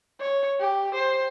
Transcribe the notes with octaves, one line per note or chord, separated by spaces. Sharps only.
C#5
G4
C5